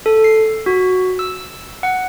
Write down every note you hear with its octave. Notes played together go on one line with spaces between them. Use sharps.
A4
C7
F#4
E6
F#5